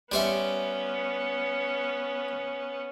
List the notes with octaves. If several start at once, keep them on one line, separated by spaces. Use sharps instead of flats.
G3 B3 C#4 C5 E5